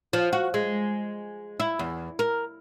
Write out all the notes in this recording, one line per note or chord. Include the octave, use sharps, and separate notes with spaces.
F3
F#4
G#3
E4
E2
A#4